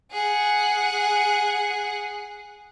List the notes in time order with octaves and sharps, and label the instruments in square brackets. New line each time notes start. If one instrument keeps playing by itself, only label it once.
[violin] G#4 F#5